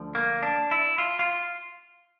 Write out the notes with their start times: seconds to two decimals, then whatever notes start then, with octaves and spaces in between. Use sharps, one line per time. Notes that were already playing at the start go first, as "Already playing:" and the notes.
Already playing: D2 D3 F3
0.15 A#3
0.43 D4
0.71 E4
0.98 F4
1.19 F4